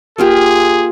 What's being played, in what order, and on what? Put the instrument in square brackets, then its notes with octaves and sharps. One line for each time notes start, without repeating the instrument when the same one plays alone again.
[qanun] A#3 F4 G4 [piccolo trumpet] G#4